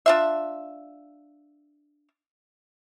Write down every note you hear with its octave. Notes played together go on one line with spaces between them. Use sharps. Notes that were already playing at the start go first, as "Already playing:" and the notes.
D4 F4 E5